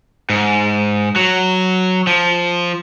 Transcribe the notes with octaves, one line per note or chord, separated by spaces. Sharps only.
G#2
F#3
F3